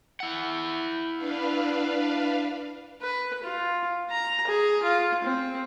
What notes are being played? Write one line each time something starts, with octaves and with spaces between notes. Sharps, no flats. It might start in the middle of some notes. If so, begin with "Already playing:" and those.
E4 F#5
D4 B4 F5
B4
F4
A#5
G#4
F4
C4